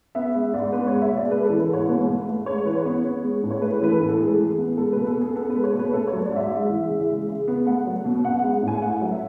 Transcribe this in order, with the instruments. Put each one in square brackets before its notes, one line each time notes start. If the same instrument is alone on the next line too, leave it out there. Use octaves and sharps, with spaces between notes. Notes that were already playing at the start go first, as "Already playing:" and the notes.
[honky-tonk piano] B3 E5
G#3 E5
G#2 D5
B3 B4
C#5
G#3
E5
B2
D5
G#3 B4
E3 A4
B4
G#2 C#5
B2 B4
A3
A3
G#3 C#5
E3 B4
C#5
B3
B3
G#3
A2
C#5
A3 B4
E3 B4
A4
A2
A4
G#3 G#4
E3
B3
G#3 A4
B2 B4
A4
B3 G#4
B3 A4
G#3 B4
C#5
B2 B4
A3 A4
F#3 C#5
D5
G#2 E5
G#3
E3
C#3
G#3
C#3
B3
A3 F#5
F#3
B2
B3 F#5
G#3 F#5
F#5
A2 G#5
A3 F#5
F#3
E5